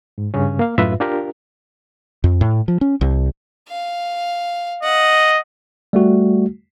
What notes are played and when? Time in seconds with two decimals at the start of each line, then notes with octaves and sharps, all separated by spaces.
0.18 G#2
0.34 G2 C#3 C#4
0.59 A#3 F5
0.78 F#2 A2 F4 B4 E5
1.00 D4 F4 G4 A#4
2.24 F2
2.41 A2
2.68 F3
2.81 C#4
3.01 C2
3.69 F5
4.83 D#5 F#5
5.93 G3 A3 F#4